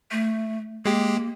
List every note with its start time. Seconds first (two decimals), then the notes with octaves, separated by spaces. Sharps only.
0.11 A3
0.85 G#3 A#3 G4